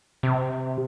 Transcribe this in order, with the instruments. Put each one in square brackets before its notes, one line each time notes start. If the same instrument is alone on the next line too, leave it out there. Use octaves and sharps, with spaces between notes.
[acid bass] C3